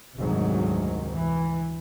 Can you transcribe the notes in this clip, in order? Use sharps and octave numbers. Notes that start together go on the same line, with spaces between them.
F1 D2 G#2 D#3 F#3
E3